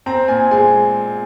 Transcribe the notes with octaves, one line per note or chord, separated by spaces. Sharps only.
C4 A#5
A#2 G#5
G#3 G#5